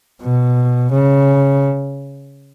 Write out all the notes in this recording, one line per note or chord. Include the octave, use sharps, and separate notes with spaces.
B2
C#3